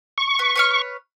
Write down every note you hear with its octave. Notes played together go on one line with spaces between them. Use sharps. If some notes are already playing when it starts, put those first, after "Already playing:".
C#6
B4
B4 C#5 F6